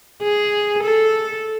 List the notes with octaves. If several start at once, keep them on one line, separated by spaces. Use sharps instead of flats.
G#4
A4